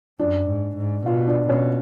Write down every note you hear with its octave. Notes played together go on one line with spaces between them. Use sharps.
F#2 D4
G#2
G#2
B2 F4
D4
B2 C#4